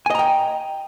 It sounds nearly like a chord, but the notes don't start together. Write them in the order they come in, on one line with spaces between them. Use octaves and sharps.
G#5 D#5 A#5 G5